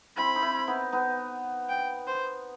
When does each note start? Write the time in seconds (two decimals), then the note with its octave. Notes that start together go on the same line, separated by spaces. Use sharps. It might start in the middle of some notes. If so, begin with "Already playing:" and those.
0.17 C4 E4 B5
0.36 D#4
0.42 C4 E4
0.67 B3 D#4
0.92 B3 D#4
1.69 G5
2.07 C5